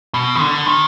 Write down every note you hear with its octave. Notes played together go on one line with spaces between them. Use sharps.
B2
D#3
D3
D#3